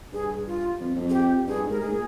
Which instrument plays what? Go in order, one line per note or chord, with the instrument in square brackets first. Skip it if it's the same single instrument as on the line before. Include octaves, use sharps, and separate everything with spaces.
[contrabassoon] G2 [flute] G#4
[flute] F4
[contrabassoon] F2
F2
[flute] G#4
G4
[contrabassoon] G2 [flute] G#4
[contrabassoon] G#2
[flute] A#4
[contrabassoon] G#2 [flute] G#4
[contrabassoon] A#2